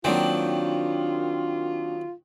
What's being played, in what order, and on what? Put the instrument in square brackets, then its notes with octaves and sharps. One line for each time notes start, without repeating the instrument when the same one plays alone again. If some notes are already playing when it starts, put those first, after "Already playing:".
[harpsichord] D#3 F#3 C4 [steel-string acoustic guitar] A#3 D4 G5 [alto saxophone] F4